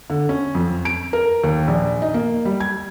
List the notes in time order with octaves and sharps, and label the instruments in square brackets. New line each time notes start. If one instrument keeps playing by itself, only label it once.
[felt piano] D3
C#4
F2
D7
A#4
D#2
A#1
D#4
A#3
G3
G#6